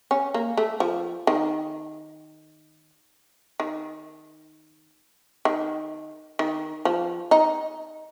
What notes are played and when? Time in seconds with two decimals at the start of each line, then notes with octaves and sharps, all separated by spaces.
0.11 C#4
0.34 A#3
0.57 A3
0.80 F3
1.27 D#3
3.60 D#3
5.45 D#3
6.39 D#3
6.85 F3
7.31 D#4